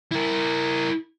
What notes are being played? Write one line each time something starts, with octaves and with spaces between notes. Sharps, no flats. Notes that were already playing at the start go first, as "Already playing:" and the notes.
E4 A#4